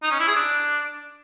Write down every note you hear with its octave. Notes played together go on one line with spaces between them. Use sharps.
D#4
C#4
E4
G#4
D4